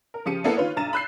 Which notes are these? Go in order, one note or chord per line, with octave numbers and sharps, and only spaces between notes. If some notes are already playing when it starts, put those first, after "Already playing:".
A#4
C#3 F3 G4 C#7 D#7
A#3 B3 E4 A4 B4
D#3 F4 B4 C#5
B1 G2 A#5 A6 D#7 E7
B5 E6 F#6 G6 C7